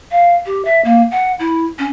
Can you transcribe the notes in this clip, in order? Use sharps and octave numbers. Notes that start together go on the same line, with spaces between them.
F5
G4
E5
A#3
F#5
E4
C#4